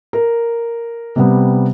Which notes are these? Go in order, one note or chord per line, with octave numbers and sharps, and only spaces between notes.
A#4
C3 G3 B3